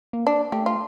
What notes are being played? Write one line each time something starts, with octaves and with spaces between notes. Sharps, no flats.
A#3
D4
A3 G4
F4